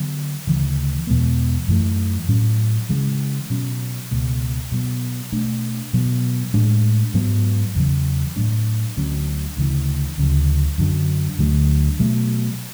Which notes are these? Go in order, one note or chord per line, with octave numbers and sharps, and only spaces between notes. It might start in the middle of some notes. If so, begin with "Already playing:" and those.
Already playing: D3 F#3 B3
D2 C#3 E3
E2 B2 G#3 B3
F#2 E3 A3
A2 F#3 C#4
C#3 E3 G#3
B2 F#3 C#4
C#2 B2 G#3
B2 F#3 B3
B2 A3 D4
B2 F#3 B3
A2 G#3 D4
G#2 F#3 B3
E2 C#3 F#3
A2 F#3 A3 D4
D2 D3 F#3 C#4
D2 C#3 E3
D2 C#3 F#3
F#2 D3 F#3
D2 D3 F#3 A3
B2 F#3 A3